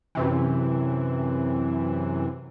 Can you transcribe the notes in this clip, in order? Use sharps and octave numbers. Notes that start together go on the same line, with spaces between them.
F#2 C3 E3